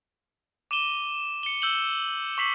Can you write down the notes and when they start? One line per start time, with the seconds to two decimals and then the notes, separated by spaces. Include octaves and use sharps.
0.71 D6 D#7 E7 G7
1.43 C#7 G7
1.62 E6 G6 C#7 F#7 G7
2.38 C#6 D6 B6 C7 F#7